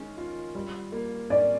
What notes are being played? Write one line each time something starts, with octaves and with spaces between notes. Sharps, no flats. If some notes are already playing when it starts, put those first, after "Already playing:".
Already playing: D#3 G#3 C#4
F4
G3
A#3
C#4 D5